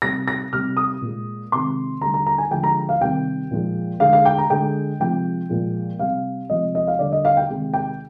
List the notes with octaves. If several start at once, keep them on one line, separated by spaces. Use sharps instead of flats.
C3 G3 A#6
A#6
C3 G3 F6
D#6
A#2 G#3
C3 D#3 G#3 C6
D3 G3 A#5
A#5
A#5
G#5
D3 F3 G#3 G5
A#5
F5
C3 D#3 G3 G5
A#2 F3 G#3
D3 G#3 F5
F5
G5
A#5
D3 G#3 G5
C3 F3 G#3 G5
A#2 F3 G#3
C3 G3 F5
C3 F3 G#3 D#5
D#5
F5
D3 G3 D5
D#5
F5
G5
C3 D#3 G#3
G5